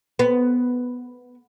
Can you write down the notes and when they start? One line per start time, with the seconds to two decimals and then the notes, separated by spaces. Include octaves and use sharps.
0.19 B3